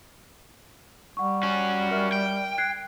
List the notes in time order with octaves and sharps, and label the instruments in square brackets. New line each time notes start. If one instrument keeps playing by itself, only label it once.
[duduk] G3 [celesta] F#5 C#6
[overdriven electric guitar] C#4 F#4
[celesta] A#4 E5 F6
[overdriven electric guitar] G5
[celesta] F#6 G#6 C7